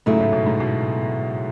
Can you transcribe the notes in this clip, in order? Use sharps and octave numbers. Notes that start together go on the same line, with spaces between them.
G#2 C#3 F#3 A3 E4
A2
B2
G#2
B2